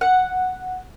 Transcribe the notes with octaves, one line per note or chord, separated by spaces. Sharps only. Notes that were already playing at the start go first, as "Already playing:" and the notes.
F#5